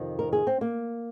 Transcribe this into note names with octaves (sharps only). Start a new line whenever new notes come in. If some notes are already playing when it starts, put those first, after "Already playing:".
Already playing: F2 C3 D#3
A#4
G#4
C4
A#3